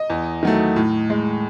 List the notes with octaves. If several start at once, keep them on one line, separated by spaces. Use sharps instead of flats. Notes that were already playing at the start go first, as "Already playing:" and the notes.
Already playing: D#5
E2
D#3 F#3 A3
A2
G#3